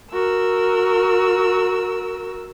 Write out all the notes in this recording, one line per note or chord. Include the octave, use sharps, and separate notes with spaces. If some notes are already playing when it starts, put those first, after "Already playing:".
F#4 A#4 E6